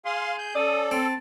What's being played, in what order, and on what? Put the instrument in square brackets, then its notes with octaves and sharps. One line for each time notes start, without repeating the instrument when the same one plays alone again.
[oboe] G#4 [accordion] F5 C6
[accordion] G6
[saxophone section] C#4 D5 [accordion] A4 [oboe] D#6
[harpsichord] C4 [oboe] A5